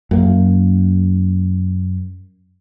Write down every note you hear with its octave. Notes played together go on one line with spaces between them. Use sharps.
F#2 A#3